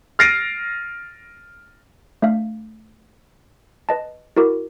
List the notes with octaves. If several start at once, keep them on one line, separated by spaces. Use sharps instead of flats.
F6 A6 A#6 C7 D7 D#7
A3 D4 E5 F5
B4 D#5 A5
E4 F#4 A#4 D6